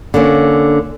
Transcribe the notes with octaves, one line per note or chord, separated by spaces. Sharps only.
D3 A#3 C#4